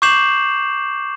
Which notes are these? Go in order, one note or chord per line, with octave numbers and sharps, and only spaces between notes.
C#6 D6 G6 C7 E7 F#7